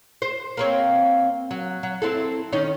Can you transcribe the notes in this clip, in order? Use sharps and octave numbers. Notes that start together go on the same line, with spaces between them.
C5
A#3 C4 C#5
F#3
F#3
C4 E4 A4
D#3 C#4 D#4